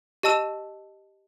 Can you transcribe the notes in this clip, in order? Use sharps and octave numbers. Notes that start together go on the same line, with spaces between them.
G4 D#5 A5 E6 E7